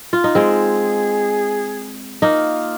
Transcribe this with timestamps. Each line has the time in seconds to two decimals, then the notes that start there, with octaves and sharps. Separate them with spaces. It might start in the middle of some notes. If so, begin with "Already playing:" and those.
0.13 F4
0.24 D#4
0.35 G#3 C4 G#4
2.22 A#3 D#4 F4